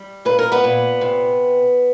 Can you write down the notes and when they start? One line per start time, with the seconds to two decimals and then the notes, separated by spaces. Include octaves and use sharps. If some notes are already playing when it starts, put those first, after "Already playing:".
Already playing: G3
0.25 A#2 B4
0.39 A#4
0.52 B3 B4
0.64 A#2
1.01 C3